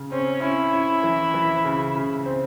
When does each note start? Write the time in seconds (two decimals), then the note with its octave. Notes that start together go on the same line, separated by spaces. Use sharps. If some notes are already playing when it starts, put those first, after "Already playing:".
Already playing: C#3
0.12 C4 C#4
0.42 C#4 E4
0.73 C#4
1.03 E3
1.34 E3
1.65 C#3
1.95 C#3
2.26 C4